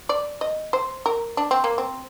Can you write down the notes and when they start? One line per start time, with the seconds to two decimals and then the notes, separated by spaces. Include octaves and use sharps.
0.09 D5
0.41 D#5
0.73 C5
1.06 A#4
1.37 D4
1.51 C4
1.64 A#3
1.78 C4